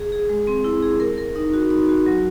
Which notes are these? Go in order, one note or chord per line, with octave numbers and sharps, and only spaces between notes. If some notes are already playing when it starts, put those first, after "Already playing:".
Already playing: G#4
G#4
G#3
C4
E4
G#4
A#4
A#4
D#4
F#4
D#4
F#4
F#3